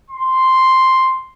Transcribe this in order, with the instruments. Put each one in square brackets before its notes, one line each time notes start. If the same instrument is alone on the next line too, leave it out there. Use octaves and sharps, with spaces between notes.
[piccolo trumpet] C6